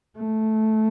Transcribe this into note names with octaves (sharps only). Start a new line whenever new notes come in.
A3